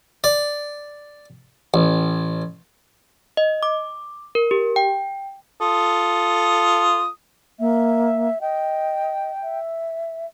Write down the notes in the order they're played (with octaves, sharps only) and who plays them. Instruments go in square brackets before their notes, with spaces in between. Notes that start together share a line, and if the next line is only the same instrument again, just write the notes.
[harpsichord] D5
A1
[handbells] D#5
D6
A#4
G4
G5
[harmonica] F4 A4 D#6
[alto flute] A#3 [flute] E5
[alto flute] D#5 [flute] G5
[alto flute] E5